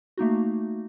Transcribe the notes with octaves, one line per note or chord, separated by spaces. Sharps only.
A3 A#3 D#4 F#4